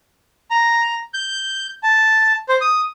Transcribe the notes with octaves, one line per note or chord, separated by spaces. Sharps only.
A#5
G6
A5
C5
D#6